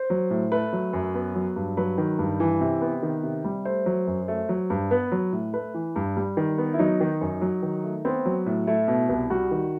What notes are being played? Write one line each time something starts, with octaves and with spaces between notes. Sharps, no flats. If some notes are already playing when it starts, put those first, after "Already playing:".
Already playing: C5
F#3
A2
A3 B4
F#3
F#2
B3
F#3
G2
F#3 B4
D#3
G2
E3
C3
B3
D#3
C3
G3
A3 C5
F#3
F#2
A3
F#3
G2
B3 B4
F#3
A2
A3 B4
E3
G2
G3
D#3
B3
E4
F#3 D#4
D#3
F#2
F#3
D#3
A3
B3 C4
F#3
A2
A3 E4
B2
C2
G3 F#4
D#3